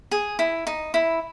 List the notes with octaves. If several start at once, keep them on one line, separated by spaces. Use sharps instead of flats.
G#4
E4
D#4
E4